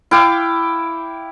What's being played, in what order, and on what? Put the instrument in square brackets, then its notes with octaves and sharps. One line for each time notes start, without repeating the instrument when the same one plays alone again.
[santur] E4 F5 G5 D6